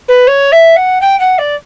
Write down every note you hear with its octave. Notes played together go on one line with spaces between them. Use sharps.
B4
C#5
E5
F#5
G5
F#5
D5